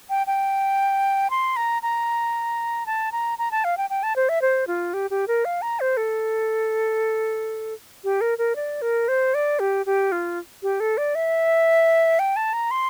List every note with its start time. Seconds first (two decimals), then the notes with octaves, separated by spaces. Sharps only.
0.10 G5
0.27 G5
1.30 C6
1.56 A#5
1.82 A#5
2.86 A5
3.12 A#5
3.38 A#5
3.51 A5
3.64 F5
3.77 G5
3.90 G5
4.03 A5
4.16 C5
4.29 E5
4.42 C5
4.67 F4
4.94 G4
5.11 G4
5.28 A#4
5.45 F5
5.62 A#5
5.80 C5
5.97 A4
8.04 G4
8.21 A#4
8.38 A#4
8.56 D5
8.82 A#4
9.08 C5
9.34 D5
9.59 G4
9.86 G4
10.12 F4
10.63 G4
10.80 A4
10.98 D5
11.15 E5
12.19 G5
12.36 A5
12.53 A#5
12.71 C6